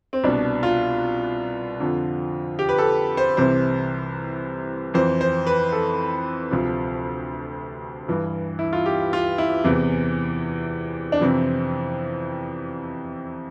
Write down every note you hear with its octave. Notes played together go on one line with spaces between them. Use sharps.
C4
C2 B2 D4
F4
F2 D3 F3
G4
B4
A4
C5
C2 C3 E3 C5
F2 E3 C5
C5
B4
A4
D2 C3 F3
G2 E3
E4
F4
G4
F4
E4
E2 C3 E3
D4
F2 C3 E3 C4